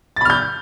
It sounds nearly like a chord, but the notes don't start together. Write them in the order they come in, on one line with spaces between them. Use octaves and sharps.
A6 B5 F6 G6